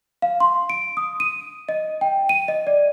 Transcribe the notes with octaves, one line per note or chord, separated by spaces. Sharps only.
F5
C6
D7
D#6
D#7
D#5
G5
D#7
D#5
D5